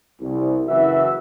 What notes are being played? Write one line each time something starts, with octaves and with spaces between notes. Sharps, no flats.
C2
F#1 E3 F#4 E5